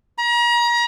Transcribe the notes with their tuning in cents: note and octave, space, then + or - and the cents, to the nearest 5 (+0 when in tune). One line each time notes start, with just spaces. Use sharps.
A#5 +35